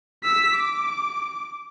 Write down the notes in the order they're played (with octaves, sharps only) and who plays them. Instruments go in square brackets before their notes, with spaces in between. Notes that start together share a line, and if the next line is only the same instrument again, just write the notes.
[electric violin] E6 B6
D6